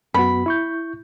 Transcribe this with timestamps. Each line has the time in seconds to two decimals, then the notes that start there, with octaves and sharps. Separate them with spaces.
0.14 F#2 B3 F#4 B5
0.46 E4 C#6 G6